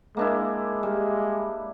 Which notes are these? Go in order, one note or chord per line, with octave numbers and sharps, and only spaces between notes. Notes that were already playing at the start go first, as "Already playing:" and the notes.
G#3 A#3 D4 E4
G3